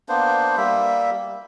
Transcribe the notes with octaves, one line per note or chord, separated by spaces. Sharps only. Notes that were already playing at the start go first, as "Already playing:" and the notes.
A#3 B3 D4 C5
G3 A#3 E5